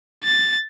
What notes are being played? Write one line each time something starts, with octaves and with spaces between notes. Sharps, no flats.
A6